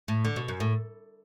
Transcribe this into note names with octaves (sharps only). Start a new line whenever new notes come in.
A2
D3
B2
F#2
A2